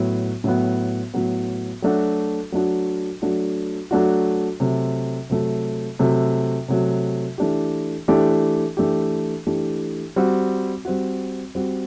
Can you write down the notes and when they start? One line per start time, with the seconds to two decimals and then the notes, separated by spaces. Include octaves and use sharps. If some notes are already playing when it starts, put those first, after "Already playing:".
Already playing: A2 F#3 B3
0.44 A2 F#3 B3
1.14 A2 F#3 B3
1.82 F#3 A3 D4 F#4
2.52 F#3 A3 D4 F#4
3.22 F#3 A3 D4 F#4
3.91 F#3 A3 D4 F#4
4.60 C3 F#3 A3
5.30 C3 F#3 A3
5.99 C3 F#3 A3
6.68 C3 F#3 A3
7.38 E3 A3 D4 G4
8.08 E3 A3 D4 G4
8.77 E3 A3 D4 G4
9.47 E3 A3 D4 G4
10.16 G3 C4 F#4
10.85 G3 C4 F#4
11.55 G3 C4 F#4